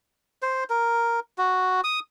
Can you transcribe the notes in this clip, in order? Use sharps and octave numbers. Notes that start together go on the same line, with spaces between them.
C5
A#4
F#4
D#6